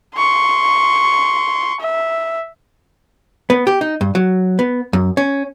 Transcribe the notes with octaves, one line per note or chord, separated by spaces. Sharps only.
C6 C#6
E5
B3
G4
D#4
G2
F#3
B3
F#2
C#4